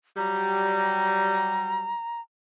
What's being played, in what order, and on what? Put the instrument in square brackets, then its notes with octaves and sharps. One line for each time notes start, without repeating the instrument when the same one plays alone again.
[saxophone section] F#3 G3 [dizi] A#5